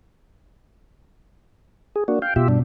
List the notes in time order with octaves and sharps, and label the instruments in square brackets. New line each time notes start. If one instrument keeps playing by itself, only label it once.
[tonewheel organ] G#4
A#3 D4 F#4
F5 G5
[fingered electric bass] B2 [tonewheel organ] F4 G4 E5
[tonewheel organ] G2 D4